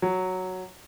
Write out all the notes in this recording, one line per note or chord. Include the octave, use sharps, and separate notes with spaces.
F#3